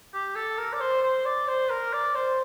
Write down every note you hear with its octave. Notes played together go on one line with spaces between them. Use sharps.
G4
A4
A#4
D5
C5
C5
D5
C5
A#4
D5
C5